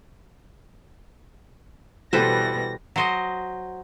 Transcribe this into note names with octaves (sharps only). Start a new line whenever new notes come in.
B2 E3 G3 A4 B4 C5 A#6
F#3 C5 D#5